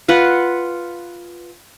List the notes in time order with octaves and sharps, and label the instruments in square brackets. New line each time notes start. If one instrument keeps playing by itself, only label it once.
[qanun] F4 B4 F#5